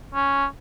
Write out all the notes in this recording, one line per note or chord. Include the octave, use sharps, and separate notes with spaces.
C#4